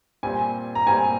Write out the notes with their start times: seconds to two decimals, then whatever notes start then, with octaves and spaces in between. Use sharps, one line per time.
0.23 A#2 G3 C4 G#5
0.75 A#5
0.87 A#2 G3 C4 G#5